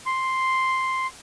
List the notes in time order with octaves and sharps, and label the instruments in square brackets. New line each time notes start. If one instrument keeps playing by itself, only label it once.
[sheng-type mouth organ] C6